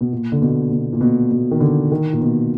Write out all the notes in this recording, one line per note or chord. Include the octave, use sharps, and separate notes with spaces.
B2
A#2
D3
B2
B2
A#2
B2
B2
D#3
D3
D#3
A#2
B2